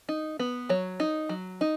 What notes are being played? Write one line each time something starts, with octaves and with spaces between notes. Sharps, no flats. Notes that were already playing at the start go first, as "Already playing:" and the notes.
D#4
B3
F#3 C#5
D#4
F#3
D#4